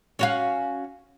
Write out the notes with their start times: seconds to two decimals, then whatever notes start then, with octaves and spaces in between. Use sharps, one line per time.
0.19 C#4 F#4 F5